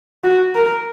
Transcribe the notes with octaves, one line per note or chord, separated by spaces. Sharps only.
F#4
A#4